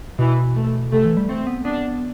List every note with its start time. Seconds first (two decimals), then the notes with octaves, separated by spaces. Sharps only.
0.19 B2 E3
0.56 A3
0.92 C3 A3
1.05 E3
1.17 G3
1.29 A3 C4
1.47 B3
1.65 B3 D4